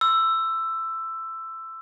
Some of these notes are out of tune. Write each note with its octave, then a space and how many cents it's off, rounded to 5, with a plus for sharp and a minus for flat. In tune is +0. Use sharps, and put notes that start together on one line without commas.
C6 +0 E6 +10